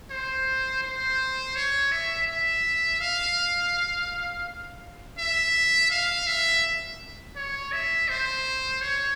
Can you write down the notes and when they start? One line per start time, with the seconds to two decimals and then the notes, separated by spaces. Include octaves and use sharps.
0.11 C5
0.83 C5
1.56 C#5
1.92 E5
2.28 E5
3.00 F5
5.18 E5
5.91 F5
6.27 E5
7.36 C#5
7.72 E5
8.08 C5
8.81 C#5